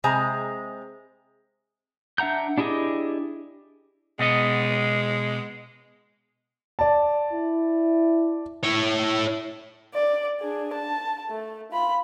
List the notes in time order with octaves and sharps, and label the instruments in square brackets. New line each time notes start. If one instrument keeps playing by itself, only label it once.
[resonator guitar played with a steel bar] C3 G#3 G#4 C5 G#5 A#5
[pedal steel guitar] D4 E5 F#5 A#5 G6
D4 E4 G4 G#4 D#5
[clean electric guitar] B2 B3 D#5 [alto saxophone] G#3
[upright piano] D5 A5
[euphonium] E4
[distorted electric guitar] E4 C#5
[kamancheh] D5
D4 G#4
A5
A3
F4 B5